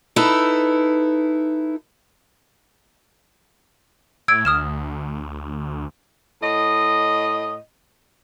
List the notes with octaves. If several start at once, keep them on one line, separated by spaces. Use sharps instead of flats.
D#4 E4 A4 B4
A2 E6 G#6 D7
D2 D#6 F6 E7
A2 D#5